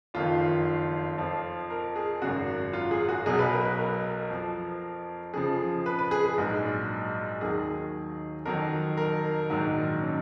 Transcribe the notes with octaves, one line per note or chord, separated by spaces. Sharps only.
F#1 F2 D#3 F4
F2 F3
A#4
G#4
G#1 F#2 C#3 F#4
F4
G#4
F#4
B1 B2 F#3 G#4
B4
A#4
B4
A#4
F2 F3
F2 C#3 F3 G#4
B4
B4
G#4
G#4
A#1 G#2 F#3
D#2 D#3 F#3 G#4
F2 D#3 F#3 A#4
A#4
A#1 G#2 D#3 F#3
C#4